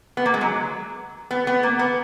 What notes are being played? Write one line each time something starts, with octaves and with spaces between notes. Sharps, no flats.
B3
A#3
G#3
F#3
B3
B3
A#3
B3